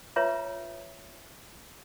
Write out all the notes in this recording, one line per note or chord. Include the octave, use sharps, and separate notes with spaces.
F4 B4 C#5 E5 A#5